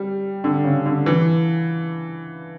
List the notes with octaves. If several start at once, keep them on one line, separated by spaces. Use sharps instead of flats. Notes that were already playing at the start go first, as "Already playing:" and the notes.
Already playing: G3
D3
C#3
D3
E3